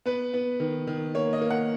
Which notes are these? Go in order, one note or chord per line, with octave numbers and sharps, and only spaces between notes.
B3 B4
B3
D#3
D#3
A#3 C#5
D#5
A#3
F#5